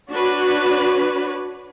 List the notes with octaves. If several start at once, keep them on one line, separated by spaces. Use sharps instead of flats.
D4 F#4 B4 C#5